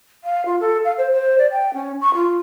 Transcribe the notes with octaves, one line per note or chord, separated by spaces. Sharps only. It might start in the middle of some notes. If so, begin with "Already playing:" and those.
F5
F4
A4
F5
C5
C5
D5
G5
C#4
C#6
F4